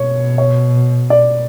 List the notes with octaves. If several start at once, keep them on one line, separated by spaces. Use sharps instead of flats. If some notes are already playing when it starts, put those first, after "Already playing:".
Already playing: B2 C#5
C#5
D5